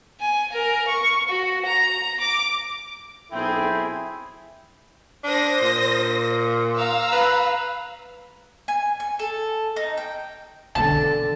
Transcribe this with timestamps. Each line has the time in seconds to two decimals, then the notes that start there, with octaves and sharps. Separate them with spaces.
0.20 G#5
0.53 A#4
0.88 C#6
1.29 F#4
1.66 A#5
2.21 D6
3.32 B1 C4 E4 G#4 A4 G5
5.24 D4 C5 D#6 A#6
5.62 A#2
6.77 F5 A#5 E6
7.13 B4
8.68 G#5
9.00 G#5
9.19 A4
9.76 D#4
9.97 G5
10.75 B2 D3 E3 A5